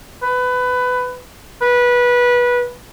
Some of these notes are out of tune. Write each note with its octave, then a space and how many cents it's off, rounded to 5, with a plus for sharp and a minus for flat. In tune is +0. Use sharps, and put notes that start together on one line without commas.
B4 +20
B4 -20